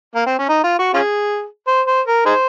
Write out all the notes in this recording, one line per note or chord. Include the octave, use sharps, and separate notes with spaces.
A#3
C4
C#4
D#4
F4
F#4
C#4 F4 G#4
C5
C5
A#4
D#4 G#4 C5